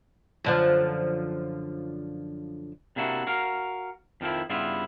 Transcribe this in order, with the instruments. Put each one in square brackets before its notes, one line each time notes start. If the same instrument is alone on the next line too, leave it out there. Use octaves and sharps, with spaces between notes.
[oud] F#2 D3 F3
[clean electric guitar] C3 A#3 D4 E4 F#4
F#4 A#4 F5
F2 D#3 F3 E4
G2 C#3 G3 B3 E4 F4